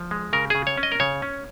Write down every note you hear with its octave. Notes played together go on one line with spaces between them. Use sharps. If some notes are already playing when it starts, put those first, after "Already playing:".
Already playing: F3
G#3
C#3 A#4
C#3 G#4
C#5
C#4
D#5
A#4
C#3 C#5
C#4